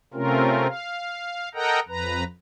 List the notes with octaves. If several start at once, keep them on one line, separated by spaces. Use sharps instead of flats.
C3 A3 C4 C#4 F4 A#4
F5
A4 A#4 D#5 F#5 G5 A#5
F2 B4 A#5